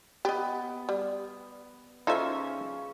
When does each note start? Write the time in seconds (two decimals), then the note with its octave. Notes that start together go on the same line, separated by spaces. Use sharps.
0.25 B3 G4 D#5
0.89 G3
2.07 C#3 C#4 D#4 F4 A4 C5 E5